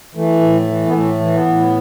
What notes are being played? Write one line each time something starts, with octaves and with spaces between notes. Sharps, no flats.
E3 A3
A2
E3
B3
A2 A3
E3
B3
A2